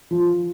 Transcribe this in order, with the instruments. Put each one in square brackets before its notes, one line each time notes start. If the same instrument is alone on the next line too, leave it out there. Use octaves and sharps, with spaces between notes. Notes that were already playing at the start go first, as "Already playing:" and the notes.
[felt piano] F3